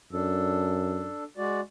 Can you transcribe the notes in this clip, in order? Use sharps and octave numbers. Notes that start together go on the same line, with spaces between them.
F#2 D4 A4
G#3 F#4 D5